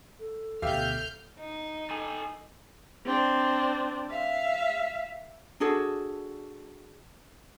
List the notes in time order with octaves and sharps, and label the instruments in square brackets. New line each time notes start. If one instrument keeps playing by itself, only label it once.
[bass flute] A4
[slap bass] D2 B2 [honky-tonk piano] G4 E5 F5 [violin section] F6 G6
[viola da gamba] D#4
[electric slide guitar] A4 G#5
[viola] C4 D4
E5 F5
[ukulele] D4 F#4 G#4 A4